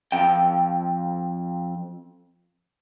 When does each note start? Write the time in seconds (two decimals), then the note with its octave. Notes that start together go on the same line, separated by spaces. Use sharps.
0.12 F2 G5